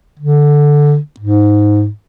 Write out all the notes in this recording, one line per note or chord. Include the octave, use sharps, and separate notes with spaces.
D3
G#2